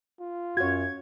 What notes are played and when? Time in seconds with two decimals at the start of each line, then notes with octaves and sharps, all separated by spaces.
0.20 F4
0.57 F#2 F#4 C#5 G#6